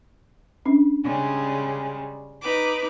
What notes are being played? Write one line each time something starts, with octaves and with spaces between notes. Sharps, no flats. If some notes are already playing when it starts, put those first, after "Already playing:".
C#4 D4
C#3 G3 G#3
D#4 B4 D6